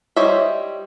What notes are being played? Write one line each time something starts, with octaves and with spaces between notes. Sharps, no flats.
G3 C5 C#5 D#5 E5